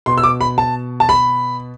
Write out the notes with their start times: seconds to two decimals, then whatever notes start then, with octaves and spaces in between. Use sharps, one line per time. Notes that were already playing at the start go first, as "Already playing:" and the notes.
0.06 B2 C6
0.18 E6
0.24 D6
0.41 B5
0.58 A5
1.00 A5
1.09 B5